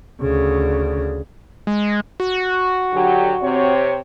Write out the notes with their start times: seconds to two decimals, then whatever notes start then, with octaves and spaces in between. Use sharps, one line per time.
0.21 D2 C#3
1.67 G#3
2.20 F#4
2.93 D3 F#3 G4
3.42 C3 C4 C#5